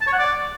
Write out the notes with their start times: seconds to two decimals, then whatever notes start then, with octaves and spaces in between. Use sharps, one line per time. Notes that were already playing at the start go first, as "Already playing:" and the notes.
0.01 A5
0.07 C#5
0.13 F#5
0.18 D5